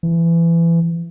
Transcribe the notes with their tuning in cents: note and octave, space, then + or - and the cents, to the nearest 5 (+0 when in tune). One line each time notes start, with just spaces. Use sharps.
E3 +25